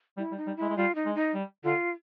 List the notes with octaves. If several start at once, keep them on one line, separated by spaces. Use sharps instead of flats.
G3 E4
G3
D#4
G3
G#3 E4
G#3
G3 F4
D#4
G#3
D#4
G3
D3 F4